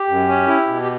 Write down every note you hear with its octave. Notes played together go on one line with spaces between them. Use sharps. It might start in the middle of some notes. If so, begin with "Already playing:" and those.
Already playing: G4
F#2
C#4
E4
B2
G4